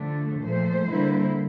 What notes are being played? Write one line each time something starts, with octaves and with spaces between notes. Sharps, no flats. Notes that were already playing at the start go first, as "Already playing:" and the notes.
Already playing: D3 F3 A3 D4
A#2 F3 A3 C5
D3 G3 A#3 E4